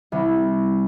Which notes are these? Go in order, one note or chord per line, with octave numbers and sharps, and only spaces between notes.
C2